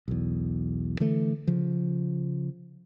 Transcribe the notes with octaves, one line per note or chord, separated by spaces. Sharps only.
B1 E2
D3 E3 A3
C#3 F3